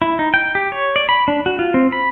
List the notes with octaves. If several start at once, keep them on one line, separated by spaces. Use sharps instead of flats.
E4
D#4
G5
G4
C#5
D5
B5
D4
F#4
F4
C4
B5